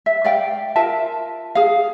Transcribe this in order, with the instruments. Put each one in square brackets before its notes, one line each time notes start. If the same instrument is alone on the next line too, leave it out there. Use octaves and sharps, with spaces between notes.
[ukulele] E5
D5 F5 G5
F4 A#4 E5 A5
G#4 F5